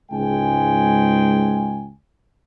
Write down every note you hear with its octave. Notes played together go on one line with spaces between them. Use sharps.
C#2 G#2 G#3 G5 G#5